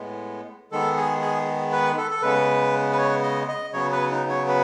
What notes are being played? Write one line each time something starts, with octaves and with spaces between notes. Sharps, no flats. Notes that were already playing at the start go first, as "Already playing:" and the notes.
Already playing: A2 G#3 B3
D#3 G#3 B3 A4
G#4
G#4
B4
A4
A4
C#3 G#3 B3 B4
B4
C#5
D#5
D#5
C#3 F#3 B3 C#5
B4
D#4
C#5
B4